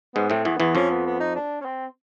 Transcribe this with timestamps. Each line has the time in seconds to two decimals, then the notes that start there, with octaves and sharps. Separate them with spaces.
0.15 G#2 G#3 B3
0.30 A2 A3 C4
0.45 E2 E3 B3
0.60 E2 E3 B3
0.75 F2 F3 C#4
0.91 B3
1.06 B3
1.20 D#4
1.35 D4
1.61 C#4
1.65 C4